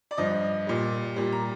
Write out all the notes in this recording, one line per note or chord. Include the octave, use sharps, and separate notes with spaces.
D5
G2 F3 D#5
A#2 G3
A#2 G3
A#5